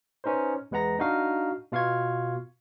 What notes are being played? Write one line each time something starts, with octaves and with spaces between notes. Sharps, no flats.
C#4 D#4 B4 C5
E2 G#3 B4 F#5 A#5 A#6
D4 D#4 F#4 F5
B2 F4 F5 C#6 G#6